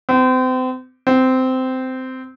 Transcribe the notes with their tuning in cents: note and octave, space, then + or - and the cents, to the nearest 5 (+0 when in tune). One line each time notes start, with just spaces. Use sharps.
C4 -35
C4 -15